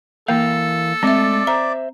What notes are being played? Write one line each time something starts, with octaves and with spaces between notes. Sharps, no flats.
E3 A#3 A4 A#4 F5
G#3 A3 C4 D5 E5
C5 E5 A#5